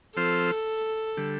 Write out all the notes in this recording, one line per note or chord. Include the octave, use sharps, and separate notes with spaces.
F3 C4 F4 A4 C5
D3 G3